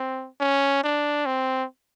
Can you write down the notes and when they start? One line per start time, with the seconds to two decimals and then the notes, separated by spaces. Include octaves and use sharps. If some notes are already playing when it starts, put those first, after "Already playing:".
Already playing: C4
0.40 C#4
0.84 D4
1.26 C4